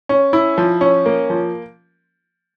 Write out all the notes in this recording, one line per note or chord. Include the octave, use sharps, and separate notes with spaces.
C#4
E4
F3
C#4
A#3
F3